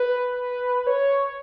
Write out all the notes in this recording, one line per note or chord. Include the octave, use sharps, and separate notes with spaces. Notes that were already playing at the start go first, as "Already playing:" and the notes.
Already playing: B4
C#5